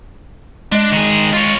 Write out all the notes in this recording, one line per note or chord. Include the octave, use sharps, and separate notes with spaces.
G#3 D4 D#5
D#3 G#4
F4 C#5